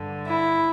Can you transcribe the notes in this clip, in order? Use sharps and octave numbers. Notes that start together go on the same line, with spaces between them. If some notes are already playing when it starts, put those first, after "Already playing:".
Already playing: G2 D3
E4